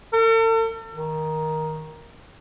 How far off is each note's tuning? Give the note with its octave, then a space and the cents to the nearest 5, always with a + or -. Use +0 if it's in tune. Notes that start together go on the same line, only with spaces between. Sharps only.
A4 +45
D#3 +5